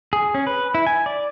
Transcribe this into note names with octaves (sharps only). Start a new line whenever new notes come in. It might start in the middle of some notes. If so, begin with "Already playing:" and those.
G#4
C#4
B4
E4
G#5
D5